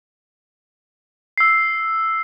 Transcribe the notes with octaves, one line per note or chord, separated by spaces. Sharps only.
E6 C7